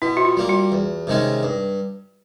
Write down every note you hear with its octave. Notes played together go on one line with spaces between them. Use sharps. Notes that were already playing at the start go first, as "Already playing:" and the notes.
B2 E4
F#4
F4
G3 A#3
F#4
E2
C3 D#3 G#3 C#4
G2